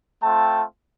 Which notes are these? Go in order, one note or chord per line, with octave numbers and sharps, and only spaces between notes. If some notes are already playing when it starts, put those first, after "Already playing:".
A3 C4 F4 G5 A5